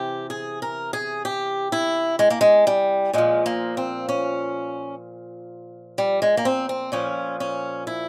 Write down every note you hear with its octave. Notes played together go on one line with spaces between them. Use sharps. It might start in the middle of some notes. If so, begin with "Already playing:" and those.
Already playing: C3 E3 G4
G#4
A#4
G#4
G4
E4
G#3
A#3
G#3
G3
A#2 F3 G#3
A#3
C4
C#4
G3
G#3
A#3
C4
C4
A#2 F3 C#4
C#4
E4